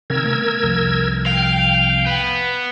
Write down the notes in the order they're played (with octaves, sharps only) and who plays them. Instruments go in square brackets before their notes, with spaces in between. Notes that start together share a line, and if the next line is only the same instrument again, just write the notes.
[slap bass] C3 D#3 [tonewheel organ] A#4 E6 G#6
[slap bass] A3 B3
C2 F2
[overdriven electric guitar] F5 [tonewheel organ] G5
[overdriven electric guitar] B3